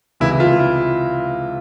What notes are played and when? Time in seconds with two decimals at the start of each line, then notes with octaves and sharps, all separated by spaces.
0.20 C#2 C3 E3 E4
0.40 F4
0.59 E4